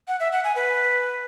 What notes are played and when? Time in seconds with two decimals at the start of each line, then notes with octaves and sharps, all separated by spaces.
0.08 F#5
0.20 E5
0.32 F#5
0.44 G#5
0.56 B4